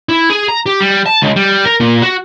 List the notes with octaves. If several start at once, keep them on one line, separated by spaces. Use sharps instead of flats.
E4
G#4
A#5
G4
G3
A5
C#2
G3
A#4
A#2
F#4